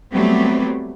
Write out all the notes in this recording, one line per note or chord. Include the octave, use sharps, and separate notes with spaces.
F#3 G3 A3 B3 C4 G4